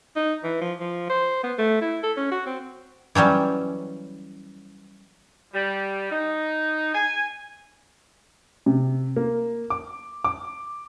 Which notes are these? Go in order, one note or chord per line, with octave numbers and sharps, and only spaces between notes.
D#4
E3
F3
F3
C5
B3
A3
E4
A4
C#4
F#4
C4
E3 F#3 G3 C#4
G3
D#4
G#5
C3
A#3
D6
D6